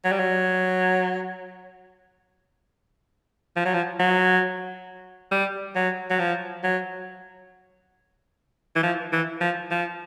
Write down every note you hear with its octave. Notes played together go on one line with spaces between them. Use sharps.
F#3
G3
F#3
F3
F#3
F3
F#3
G3
F#3
F#3
F3
F#3
E3
F3
E3
F3
F3